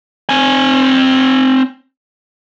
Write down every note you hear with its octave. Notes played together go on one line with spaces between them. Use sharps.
C4 G#5